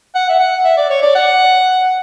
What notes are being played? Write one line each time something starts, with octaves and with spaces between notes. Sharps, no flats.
F#5
E5
F#5
E5
D5
C#5
D5
F#5